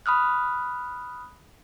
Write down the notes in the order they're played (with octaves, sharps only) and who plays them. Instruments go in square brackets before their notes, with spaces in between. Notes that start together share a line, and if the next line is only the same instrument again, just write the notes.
[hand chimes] B5 D#6 F6 F#6